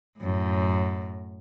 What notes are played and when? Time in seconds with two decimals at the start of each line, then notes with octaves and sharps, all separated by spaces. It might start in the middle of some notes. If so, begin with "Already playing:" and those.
0.19 F#2 A2